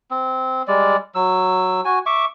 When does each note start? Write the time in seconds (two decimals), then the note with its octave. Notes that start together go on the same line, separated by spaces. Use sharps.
0.11 C4
0.68 G3 G#3 D5
1.15 F#3 E6
1.85 F#4 G#5
2.06 E5 C#6 D6